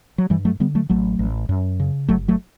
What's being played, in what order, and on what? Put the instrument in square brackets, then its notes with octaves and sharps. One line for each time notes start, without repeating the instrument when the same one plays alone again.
[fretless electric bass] F#3
G2 E3 G3
F#3 A3
D3 G3 B3
F#3 A3
A1 F#3 A3
A1
F#2
C#3
G1 F#3 A3
F#3 A3